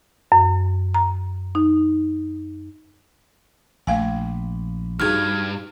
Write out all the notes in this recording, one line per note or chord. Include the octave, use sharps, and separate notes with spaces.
F#2
A#5
D#4
A#1 A3 F5 G#5
B1 G2 D#4 F#4 G#4 F6 G#6